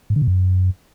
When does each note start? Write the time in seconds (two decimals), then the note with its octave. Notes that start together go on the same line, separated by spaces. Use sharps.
0.10 G#2
0.16 D3
0.22 B2
0.28 F#2